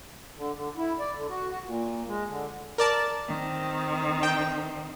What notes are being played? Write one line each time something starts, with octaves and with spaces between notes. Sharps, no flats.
D3
D3
E4
D5
D3
F#4
F#4
A#2
G#3
D3
A#4 D5 A5
D#3 C4
G5